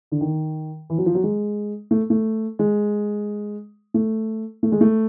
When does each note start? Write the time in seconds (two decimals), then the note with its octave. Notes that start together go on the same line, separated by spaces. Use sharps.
0.12 D3
0.21 D#3
0.90 E3
0.98 F#3
1.06 F3
1.15 F#3
1.24 G#3
1.91 A3
2.10 A3
2.59 G#3
3.94 A3
4.63 A3
4.72 G#3
4.81 A3